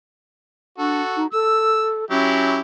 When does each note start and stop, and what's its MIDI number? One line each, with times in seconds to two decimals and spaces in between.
0.79 1.02 62
0.79 1.22 66
0.79 1.22 69
1.16 1.27 63
1.33 2.05 69
1.33 1.87 88
2.11 2.60 54
2.11 2.60 61
2.11 2.60 64
2.11 2.60 67